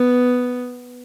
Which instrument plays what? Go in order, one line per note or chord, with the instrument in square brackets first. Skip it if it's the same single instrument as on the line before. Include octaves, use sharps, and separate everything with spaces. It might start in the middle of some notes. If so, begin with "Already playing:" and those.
Already playing: [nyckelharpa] B3